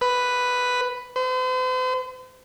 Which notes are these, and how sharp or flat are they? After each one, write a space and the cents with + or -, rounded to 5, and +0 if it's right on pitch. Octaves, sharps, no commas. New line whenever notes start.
B4 +5
C5 -45